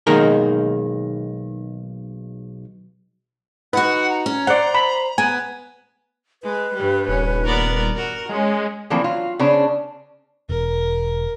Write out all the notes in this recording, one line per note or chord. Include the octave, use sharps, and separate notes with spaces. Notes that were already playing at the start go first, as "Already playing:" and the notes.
B1 D#3 G#3 A#3 A#4
D#4 F#4 B4 F#5
A#5
C#4
C5 D5 F#5
B5
B3 G#5
G#3 B4
G2 G3
D#1 C#4
B3 A#4 D5
F#4 A#4
G#3 C#4
D3 E3 F3 A3 A#3 C4
F#3 F4
C#3 B3 C#4 D4 C5
E1 A#4